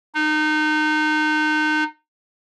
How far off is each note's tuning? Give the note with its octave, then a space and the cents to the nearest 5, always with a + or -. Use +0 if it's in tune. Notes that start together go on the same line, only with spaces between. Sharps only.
D#4 -25